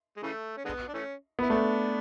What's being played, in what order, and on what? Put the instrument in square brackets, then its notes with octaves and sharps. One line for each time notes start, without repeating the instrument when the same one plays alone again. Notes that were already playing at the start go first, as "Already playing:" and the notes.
[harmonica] G#3
C#3 E3 A3
C#4
D3 G#3 B3
D4
E3 A3 C#4
[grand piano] B3 [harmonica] E4
[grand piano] A3 [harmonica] B3 D4